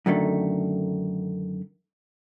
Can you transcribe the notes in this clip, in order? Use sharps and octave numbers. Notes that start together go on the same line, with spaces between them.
F#2 D3 D#3 A3